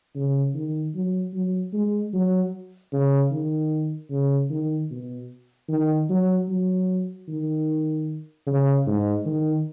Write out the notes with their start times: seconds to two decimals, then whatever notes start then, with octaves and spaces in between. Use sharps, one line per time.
0.16 C#3
0.54 D#3
0.95 F#3
1.34 F#3
1.73 G#3
2.13 F#3
2.93 C#3
3.31 D#3
4.10 C#3
4.50 D#3
4.91 B2
5.69 D#3
6.09 F#3
6.48 F#3
7.28 D#3
8.46 C#3
8.87 G#2
9.26 D#3